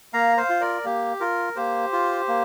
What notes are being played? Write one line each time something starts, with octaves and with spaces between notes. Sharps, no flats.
A#3 F5 A#5
C5 F5
F4
A#4 D5
A#3 G4
F4 A#4
A#3 G4 C5
F4
A#3